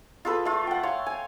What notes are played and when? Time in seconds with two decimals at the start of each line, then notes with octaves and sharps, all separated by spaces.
0.25 F4 G#4 A4 B4
0.45 A3 F4
0.67 F#5 G5
0.83 C#5 F5 C6
1.06 G#5